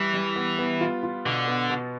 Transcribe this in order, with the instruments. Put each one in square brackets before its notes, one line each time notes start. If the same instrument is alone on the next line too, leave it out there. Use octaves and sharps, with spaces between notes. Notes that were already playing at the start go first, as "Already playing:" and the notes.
Already playing: [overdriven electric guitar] E3 [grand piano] G3
[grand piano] G3
B3
B3
F4
F4
[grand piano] B2 [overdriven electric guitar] D3
[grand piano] B3
B2